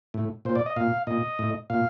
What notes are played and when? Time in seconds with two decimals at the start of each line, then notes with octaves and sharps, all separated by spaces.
0.14 A2
0.45 A#2 C5
0.55 D5
0.66 D#5
0.76 A#2 F5
1.07 A#2 D#5
1.39 A2
1.70 A#2 F5